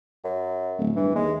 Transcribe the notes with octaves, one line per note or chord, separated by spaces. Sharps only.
F#2
D1
G2 E3
D#2 G#3